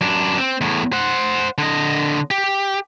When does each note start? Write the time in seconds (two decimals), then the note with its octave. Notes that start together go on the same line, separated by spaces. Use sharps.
0.01 F#2 D4
0.38 C4
0.61 E2 A2
0.93 C5 F#5
1.58 D3 D#5
2.31 G4